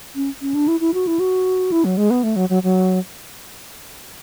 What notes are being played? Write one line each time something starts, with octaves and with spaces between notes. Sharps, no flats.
C#4
C#4
D4
E4
E4
F#4
E4
F#4
E4
F#3
G#3
B3
A3
F#3
F#3
F#3